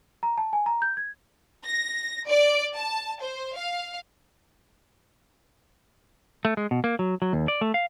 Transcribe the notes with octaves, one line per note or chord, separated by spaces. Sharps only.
A#5
A5
G#5
A#5
G6
G#6
A#6
D5
A5
C5
F5
A3
G#3
B2
A#3
F#3
F#3
D#2
D5
A3
F5